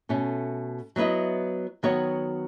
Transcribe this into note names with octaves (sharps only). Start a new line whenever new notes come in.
B2 A3 C#4
F#3 B3 E4 B4 D#5
D#3 F#3 B3 F#4 C#5